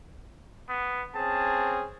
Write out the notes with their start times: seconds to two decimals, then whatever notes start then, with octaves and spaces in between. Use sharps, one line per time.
0.69 B3
1.15 C4 C#4 G#4 A5